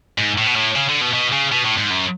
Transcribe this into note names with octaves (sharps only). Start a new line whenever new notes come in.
G#2
A2
B2
A2
C#3
D3
B2
B2
C#3
B2
A2
G#2
F#2